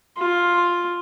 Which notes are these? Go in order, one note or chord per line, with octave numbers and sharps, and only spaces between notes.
F4